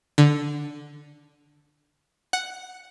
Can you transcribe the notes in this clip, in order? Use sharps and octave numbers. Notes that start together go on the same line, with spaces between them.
D3
F#5